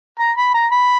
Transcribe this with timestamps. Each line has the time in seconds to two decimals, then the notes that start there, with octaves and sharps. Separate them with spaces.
0.19 A#5
0.37 B5
0.54 A#5
0.72 B5